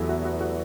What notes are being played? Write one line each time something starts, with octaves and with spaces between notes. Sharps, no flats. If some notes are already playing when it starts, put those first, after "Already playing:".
Already playing: E2 F#3 G3 A3 B3 E4
F#4
F#4
F#4